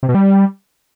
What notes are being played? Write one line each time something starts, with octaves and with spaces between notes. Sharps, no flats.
C3
B2
G3